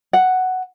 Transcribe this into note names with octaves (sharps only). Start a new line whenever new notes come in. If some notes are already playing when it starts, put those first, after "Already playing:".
F#5